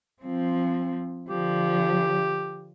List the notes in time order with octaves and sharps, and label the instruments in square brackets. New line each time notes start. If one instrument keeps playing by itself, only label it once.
[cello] F3 C4
[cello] D3 F3 [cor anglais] G4